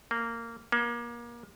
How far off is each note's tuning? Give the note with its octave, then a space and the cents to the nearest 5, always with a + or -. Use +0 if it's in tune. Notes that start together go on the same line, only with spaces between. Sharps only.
A#3 -15
A#3 +30